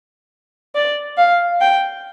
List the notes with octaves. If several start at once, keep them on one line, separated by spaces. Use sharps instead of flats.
D5
F5
G5